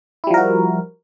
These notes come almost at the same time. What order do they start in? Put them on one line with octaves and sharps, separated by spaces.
E4 G3 F3 A#4 F#4